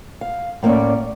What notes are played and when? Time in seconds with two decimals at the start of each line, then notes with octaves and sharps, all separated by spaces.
0.21 F5
0.63 A2 A#3 C4 C#4 D5